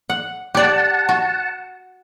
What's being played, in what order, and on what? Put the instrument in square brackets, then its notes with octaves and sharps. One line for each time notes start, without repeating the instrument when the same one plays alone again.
[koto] F#5
[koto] G4 D5 [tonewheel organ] F#5 A5
[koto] F#4